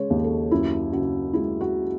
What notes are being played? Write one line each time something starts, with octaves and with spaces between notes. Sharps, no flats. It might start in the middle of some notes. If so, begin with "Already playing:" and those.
Already playing: C#3 G#3 C#5
D#2
A4
F#2 E4
C#3 F#4
G#3 E4
F#4